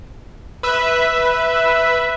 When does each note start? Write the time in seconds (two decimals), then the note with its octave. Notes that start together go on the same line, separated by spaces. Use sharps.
0.63 B4 E5